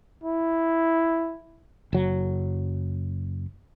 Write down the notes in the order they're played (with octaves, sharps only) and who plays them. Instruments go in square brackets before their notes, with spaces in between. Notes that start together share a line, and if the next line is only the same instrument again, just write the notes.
[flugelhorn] E4
[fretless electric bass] F#1 F#3